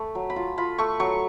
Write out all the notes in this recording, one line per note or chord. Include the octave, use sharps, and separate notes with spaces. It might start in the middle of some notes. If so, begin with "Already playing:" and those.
Already playing: A3 B5 C#6
F#3
B5
F4
F4 B5
A3 C#6
F#3 C#6